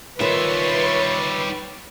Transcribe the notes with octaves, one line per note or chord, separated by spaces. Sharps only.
D#3 G3 F4 B4 C#5 E5 C6